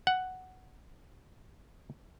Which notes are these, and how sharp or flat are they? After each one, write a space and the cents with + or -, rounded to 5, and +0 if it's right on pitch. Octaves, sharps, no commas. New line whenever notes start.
F#5 +5